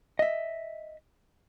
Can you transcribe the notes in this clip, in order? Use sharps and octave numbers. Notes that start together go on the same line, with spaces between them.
D#5 E5